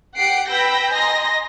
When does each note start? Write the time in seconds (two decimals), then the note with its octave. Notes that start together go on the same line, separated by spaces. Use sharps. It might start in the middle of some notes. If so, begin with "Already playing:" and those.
0.17 G4 F#5 C7 D7
0.48 B4 G5 B5 E6 G6 A#6
0.92 D#5 G#5 A#5 C6 A#6